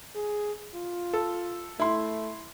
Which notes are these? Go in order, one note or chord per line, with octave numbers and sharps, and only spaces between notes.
G#4
F4
A4
A3 E4 C6